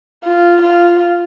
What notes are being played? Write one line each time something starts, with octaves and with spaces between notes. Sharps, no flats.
F4
F4